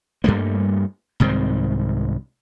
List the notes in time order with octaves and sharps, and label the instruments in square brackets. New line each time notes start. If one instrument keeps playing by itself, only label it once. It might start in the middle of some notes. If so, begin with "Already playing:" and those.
[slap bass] G2 G3 A3 A#3
C2 G#2 D#3 C4